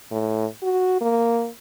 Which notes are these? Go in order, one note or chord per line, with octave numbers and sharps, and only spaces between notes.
A2
F#4
A#3